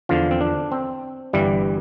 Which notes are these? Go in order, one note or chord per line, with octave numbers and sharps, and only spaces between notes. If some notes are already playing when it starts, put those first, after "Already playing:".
E2 D3 F3 F4
C4
D4
C4
G1 G2 E3 G3